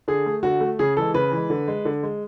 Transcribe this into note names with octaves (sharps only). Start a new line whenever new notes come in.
D3 G#4
A3
D3 F#4
A3
C#3 G#4
E3 G#3 A4
C#3 B4
E3
G#3
D3
G#3
D3
G#3